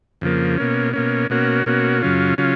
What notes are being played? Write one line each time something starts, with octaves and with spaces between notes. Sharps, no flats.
F2 C#3 F3 A#3
B2 A#3 C#4
B2 A#3 C#4
B2 A#3 C#4 F#4
B2 A#3 C#4 F#4
F#2 C#3 F#3 C#4 F4
C#3 F#3 C#4 F4